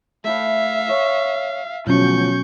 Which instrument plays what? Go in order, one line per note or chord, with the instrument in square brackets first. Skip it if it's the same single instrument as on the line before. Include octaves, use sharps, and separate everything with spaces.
[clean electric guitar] A3 E4 [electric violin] E5 F5
[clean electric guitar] C#5
[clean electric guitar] D2 F3 F4 [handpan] B2 F#3 C#4 [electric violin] C#6 G6